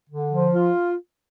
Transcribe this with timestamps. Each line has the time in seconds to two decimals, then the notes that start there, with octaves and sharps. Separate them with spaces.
0.09 D3
0.31 F3
0.54 F4